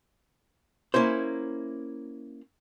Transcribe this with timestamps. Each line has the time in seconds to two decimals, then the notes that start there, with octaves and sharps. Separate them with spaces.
0.94 A#3 C#4 E4 C5